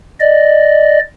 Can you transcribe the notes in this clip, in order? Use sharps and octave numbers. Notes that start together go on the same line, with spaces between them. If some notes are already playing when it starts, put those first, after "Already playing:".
D5 D#5